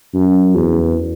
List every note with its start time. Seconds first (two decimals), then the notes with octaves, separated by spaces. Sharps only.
0.14 F#2
0.55 E2